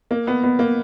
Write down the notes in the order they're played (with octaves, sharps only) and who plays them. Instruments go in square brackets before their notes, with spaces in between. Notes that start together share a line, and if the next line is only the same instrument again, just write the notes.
[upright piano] A#3
B3
B3
A#3